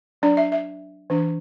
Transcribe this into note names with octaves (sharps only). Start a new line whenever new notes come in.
F#3 D4 D5
E5
E5
E3 D4